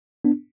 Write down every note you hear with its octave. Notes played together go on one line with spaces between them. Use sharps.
B3 D4